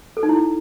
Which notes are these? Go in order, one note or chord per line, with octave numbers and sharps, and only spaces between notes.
A4
D#4
E4